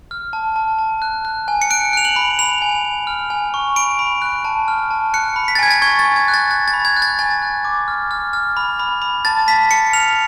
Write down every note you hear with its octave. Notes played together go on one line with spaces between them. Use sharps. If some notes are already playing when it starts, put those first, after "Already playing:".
F6
A5
A5
A5
F#6
F#6
G#5
C#7
F#6 D7
F#6 F7
F#7
B5
B5 F7
G#5
G#5
F6
G#5
C#6
B5 D7
B5
F#6
A5
F6
A5
F#6 C#7
B5
B6
A6
G#5 G#6
A6
C#6 G#6
A6
G#5
G#6
F#6
A6
F#6 A6
A6
B5
G#6
F#6
A6
G#5 A6
F#6
D6
F6
F6
F6
B5
B5
B5
A5 A6
A5 B6
A5 C#7
F6 F7